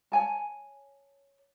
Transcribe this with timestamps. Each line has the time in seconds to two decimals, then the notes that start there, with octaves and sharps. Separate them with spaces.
0.12 C#5 G#5 A5